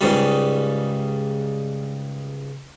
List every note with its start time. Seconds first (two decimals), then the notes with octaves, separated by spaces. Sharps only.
0.01 C#2 G#2 C#3 G3